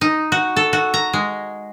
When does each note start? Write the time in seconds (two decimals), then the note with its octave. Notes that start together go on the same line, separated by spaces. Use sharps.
0.01 D#4
0.32 F#4
0.56 A4
0.73 F#4
0.94 A#5
1.13 G#3